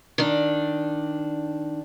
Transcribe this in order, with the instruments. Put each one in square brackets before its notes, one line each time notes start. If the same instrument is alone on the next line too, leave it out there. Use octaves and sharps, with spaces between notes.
[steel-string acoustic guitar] D#3 D4